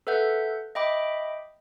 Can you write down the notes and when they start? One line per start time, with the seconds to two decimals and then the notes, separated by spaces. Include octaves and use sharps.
0.07 A4 B4 E5 F#5 G6
0.75 D#5 E5 G5 B5 D6